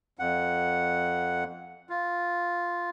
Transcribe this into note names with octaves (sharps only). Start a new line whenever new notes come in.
F2 F#5
F4